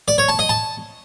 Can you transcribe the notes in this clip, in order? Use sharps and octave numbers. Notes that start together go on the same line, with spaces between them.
D5
C#5
A5
D#5
A5